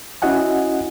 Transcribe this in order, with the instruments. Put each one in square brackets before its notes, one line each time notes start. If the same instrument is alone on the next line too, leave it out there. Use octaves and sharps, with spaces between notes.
[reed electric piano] C#4 E4 F#4 D#5 F#5 G#5